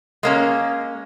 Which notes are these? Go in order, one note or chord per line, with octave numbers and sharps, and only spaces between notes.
G#3 A#3 C#4